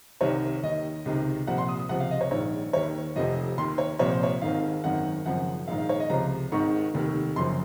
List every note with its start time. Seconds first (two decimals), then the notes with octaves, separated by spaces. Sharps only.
0.21 C2 C3 D#3 C#5
0.63 D#2 D#3 D#5
1.05 C#2 C3 D#3
1.47 C2 A#2 F3 F#5
1.58 C6
1.68 D#6
1.79 D#6
1.89 C#2 C3 F3 F#5
2.00 F5
2.11 D#5
2.21 C#5
2.31 A#1 G#2 D#3 C#5
2.73 D#2 D#3 C#5
3.16 F1 F2 C3 F3 D#5
3.57 D#2 D#3 C6
3.78 C#5
3.99 C2 A#2 F3 C#5
4.12 C5
4.23 C#5
4.42 G#1 G#2 D#3 F5
4.84 G#1 F#2 D#3 F#5
5.26 G#1 F#2 C#3 F3 F#5
5.67 A#1 G#2 D#3 F5
5.78 F5
5.89 C#5
6.00 D#5
6.09 C#2 C3 F3 A#5
6.52 G#1 G#2 D#3 C#6
6.94 F1 D#2 D#3
7.36 F#1 F#2 F3 C6